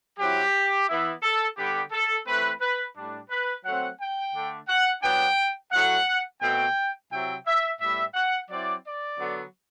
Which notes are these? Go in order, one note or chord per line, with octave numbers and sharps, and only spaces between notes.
F#3 C4 E4 G4
E3 B3 E4
A4
D3 G3 B3 G4
A4
E3 A3 C4 B4
B4
A2 G3 D4
B4
F#3 A3 C4 F#5
G5
D3 A3 D4
F#5
F#3 B3 D4 G5
A2 F#3 A3 F#5
B2 A3 C4 G5
C3 F#3 C4 E4 G5
E5
A2 G3 B3 E5
F#5
F#3 C4 E4 D5
D5
D3 F#3 B3